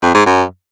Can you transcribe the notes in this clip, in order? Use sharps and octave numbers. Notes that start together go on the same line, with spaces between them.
F2
G#2
F#2